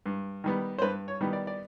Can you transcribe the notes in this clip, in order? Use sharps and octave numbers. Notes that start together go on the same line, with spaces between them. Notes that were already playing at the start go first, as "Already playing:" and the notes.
G2
D#3 G3 B3
C5
G2 B4
C#5
D#3 G3 B3
D5
D5